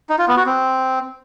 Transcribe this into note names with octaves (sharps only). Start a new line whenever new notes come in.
D#4
F4
B3
F#4
C4